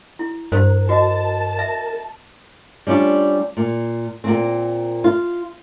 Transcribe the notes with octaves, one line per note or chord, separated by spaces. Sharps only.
E4
G2 A#4 C5
F#4 D#5 A5
E5
G3 C#4 D4 F4
A#2
A#2 A#3 C4
F4